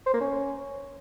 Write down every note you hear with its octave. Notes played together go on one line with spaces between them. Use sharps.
C5
A#3
C#4